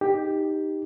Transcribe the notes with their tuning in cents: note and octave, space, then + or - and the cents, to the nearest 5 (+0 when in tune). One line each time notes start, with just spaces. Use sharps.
D#4 +0 G4 +5